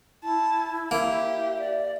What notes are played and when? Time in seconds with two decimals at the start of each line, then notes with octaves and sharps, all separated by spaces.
0.24 E4 A5
0.91 A#3 G4 E5
1.59 D5